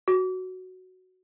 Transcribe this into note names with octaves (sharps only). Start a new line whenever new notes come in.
F#4